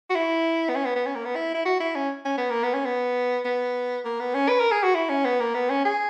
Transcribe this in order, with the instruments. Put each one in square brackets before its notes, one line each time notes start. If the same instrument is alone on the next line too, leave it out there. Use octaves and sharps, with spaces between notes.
[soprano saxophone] F#4
E4
B3
C#4
B3
B3
C#4
A#3
B3
E4
E4
F#4
E4
C#4
C#4
B3
A#3
B3
C#4
B3
B3
A#3
B3
C#4
B4
A#4
G#4
F#4
E4
C#4
B3
A#3
B3
C#4
G#4